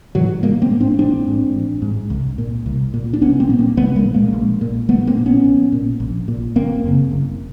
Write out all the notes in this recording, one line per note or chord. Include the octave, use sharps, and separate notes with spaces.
G#2 E3 F#3
A1 G#3 A#3
A#3 C4
G#2
C4 D4
A1 C4 D4
G#2
A1
G#2
C2
A#2
C2
A#2
D4
C2 B3 C#4
A#3 C4
A#2 B3
A#3 C4
C2 A3 B3
G#3 A#3
A#2
G#3 A#3
A#1
A#2
A#1 A3 B3
A#3 C4
A#2
B3 C#4
A#1
A#2
A#1
A#2
F#1 A#3 C4
F#2 C#3
F#1